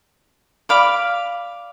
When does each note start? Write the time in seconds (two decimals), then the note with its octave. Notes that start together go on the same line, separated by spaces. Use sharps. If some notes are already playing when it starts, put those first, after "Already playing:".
0.69 D5 F5 B5 D6